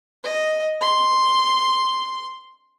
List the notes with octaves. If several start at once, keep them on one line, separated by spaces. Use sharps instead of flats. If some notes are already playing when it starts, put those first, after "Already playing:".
D#5
C6